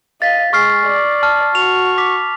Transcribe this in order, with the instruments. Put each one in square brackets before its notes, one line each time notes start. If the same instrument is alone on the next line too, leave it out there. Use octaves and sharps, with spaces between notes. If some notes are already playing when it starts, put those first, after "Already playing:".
[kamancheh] D#5 F5 [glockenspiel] A6 B6
[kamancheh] G#3 [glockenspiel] C#6 F6 C7
[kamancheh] D5
[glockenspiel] A5 F6
[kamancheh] F#4 C#6 [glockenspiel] F7
[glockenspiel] D6 B6